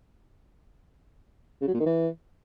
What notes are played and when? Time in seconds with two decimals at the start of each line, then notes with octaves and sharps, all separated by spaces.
1.62 C#3
1.68 F#3
1.74 A#2
1.80 D#3
1.86 E3